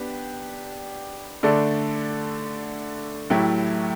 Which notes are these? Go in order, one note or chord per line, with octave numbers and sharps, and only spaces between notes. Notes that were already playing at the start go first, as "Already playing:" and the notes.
Already playing: B3 D4 G4
D3 A3 D4 A4 D5
A2 F#3 A3 E4 G4